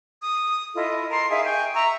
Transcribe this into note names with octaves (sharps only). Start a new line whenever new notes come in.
D#6
E4 F4 A4 D#5
A#4 A5 C6
D#4 G#4 E5 F5
G5 G#5 C#6
E5 A#5 C#6 E6